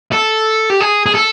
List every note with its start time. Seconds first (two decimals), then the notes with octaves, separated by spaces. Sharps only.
0.12 A4
0.70 G4
0.80 G#4
1.06 G#4
1.14 A4